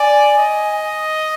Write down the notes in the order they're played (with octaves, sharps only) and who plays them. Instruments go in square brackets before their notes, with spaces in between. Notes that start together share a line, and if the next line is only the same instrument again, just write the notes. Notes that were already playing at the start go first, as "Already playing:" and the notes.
Already playing: [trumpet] D5 [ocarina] G#5
[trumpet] D#5